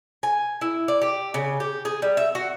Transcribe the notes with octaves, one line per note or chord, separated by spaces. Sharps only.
G#5
E4
D5
G4
C#3
G4
G#4
G3
E5
F#4